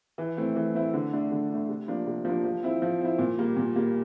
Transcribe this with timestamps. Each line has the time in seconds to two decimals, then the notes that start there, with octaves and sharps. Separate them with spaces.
0.18 E3
0.37 A3 C4 E4
0.56 E3
0.74 A3 C4 E4
0.93 D3
1.13 A3 D4
1.31 D3
1.50 A3 D4
1.68 C3
1.88 F3 A#3 D4
2.06 C3
2.25 F3 A#3 D4
2.44 F3
2.63 C4 E4
2.82 F3
3.01 C4 E4
3.19 A#2
3.38 G3 A#3
3.57 A#2
3.76 G3 A#3